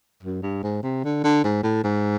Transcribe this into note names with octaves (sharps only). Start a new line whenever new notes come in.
F#2
G2
G#2
C3
D3
D3
G#2
A2
G#2